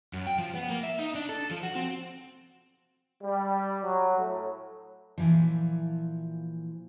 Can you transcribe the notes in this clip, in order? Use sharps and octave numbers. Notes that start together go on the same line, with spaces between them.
F#2
G5
F3
B3
A#3
E5
D#4
D4
A4
F3
F#4
C4
G3
F#3
A2
A#2 E3 F3